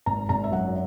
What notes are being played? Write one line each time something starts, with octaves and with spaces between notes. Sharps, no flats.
G#1 A#5
G#1 A#5
E5
F#2 F#5